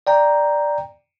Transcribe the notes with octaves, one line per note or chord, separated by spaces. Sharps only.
D5 G5 A#5